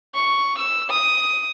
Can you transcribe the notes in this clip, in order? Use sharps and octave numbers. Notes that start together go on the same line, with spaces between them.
C#6
E6
D#6